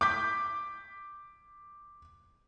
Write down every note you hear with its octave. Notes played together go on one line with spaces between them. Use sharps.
D6 G6 B6